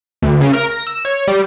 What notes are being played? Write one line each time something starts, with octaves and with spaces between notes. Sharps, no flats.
D2
C#3
A#4
A#6
E6
C#5
G3